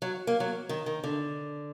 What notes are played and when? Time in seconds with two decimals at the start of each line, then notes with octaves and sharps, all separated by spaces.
0.02 F#3
0.27 A#3
0.40 F#3
0.69 D#3
0.86 D#3
1.04 D3